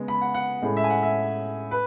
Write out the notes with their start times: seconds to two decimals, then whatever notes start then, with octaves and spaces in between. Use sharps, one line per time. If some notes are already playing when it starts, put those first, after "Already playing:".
Already playing: C#3 G#3 B3
0.08 B5
0.21 F#5
0.34 F#5
0.62 A2 G#3 C#4
0.77 E5
0.84 G#5
0.90 F#5
1.03 E5
1.71 B4